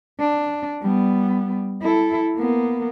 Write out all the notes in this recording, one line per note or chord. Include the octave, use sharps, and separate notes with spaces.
D4
G3 B3
E4 A4
A#3 B3